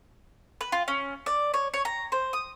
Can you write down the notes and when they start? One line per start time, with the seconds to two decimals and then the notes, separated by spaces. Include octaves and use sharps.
0.61 B4
0.72 F4
0.88 C#4
1.26 D5
1.54 C#5
1.74 C#5
1.85 A#5
2.12 C5
2.33 D#6